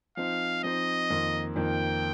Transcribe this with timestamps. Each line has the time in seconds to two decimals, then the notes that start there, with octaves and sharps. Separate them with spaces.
0.17 F3 C4 D#4 C5 F5
0.64 F3 C4 D#4 C5 D#5
1.10 F2 D#3 A#3
1.56 F2 D#3 A#3 G5